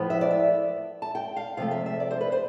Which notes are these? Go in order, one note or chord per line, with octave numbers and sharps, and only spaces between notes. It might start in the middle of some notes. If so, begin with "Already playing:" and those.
Already playing: A2 F3 B3
E5
D5
E5
A5
G5
F5
C3 F3 A3 F5
E5
E5
D5
C5
B4
C5